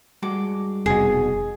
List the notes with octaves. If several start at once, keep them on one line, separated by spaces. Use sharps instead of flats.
G2 G#3 F#4 D6
F1 B2 G#4